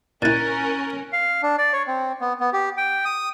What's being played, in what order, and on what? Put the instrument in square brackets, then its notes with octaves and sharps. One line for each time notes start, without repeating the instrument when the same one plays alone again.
[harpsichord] A#2 E4 [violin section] C#4 A#4 [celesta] F#6 A6 D#7
[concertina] F5
D4
D5
C#5
C4
B3
B3
G4
G5
D#6